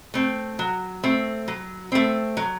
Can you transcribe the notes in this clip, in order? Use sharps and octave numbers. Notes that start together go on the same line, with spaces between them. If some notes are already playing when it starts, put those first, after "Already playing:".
A3 C4
F#3
A3 C4
F#3
A3 C4
F#3